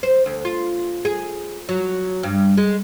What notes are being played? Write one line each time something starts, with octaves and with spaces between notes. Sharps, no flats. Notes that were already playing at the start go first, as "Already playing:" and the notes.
C5
D2
F4
G#4
F#3
G2
G#3